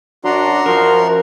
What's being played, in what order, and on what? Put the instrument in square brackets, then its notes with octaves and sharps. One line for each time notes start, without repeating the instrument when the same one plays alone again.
[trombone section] F#2 F#3 D4 [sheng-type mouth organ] F#4 A#5 C6
[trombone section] F#2 F3 [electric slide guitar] A#4